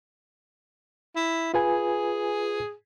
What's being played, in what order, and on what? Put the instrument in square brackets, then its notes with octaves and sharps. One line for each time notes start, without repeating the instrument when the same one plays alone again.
[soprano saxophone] E4
[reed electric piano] F4 B4 G#5 [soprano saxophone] G#4